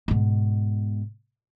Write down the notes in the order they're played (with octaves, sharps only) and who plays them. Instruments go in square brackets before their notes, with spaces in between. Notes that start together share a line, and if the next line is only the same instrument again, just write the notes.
[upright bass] G#2 B2